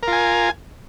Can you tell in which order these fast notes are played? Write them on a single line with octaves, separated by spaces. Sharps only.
A#4 F4 G#5